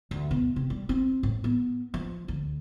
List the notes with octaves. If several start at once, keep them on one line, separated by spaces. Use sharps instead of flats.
D2
B2
C3
G3
C4
A2
B3
F3
D2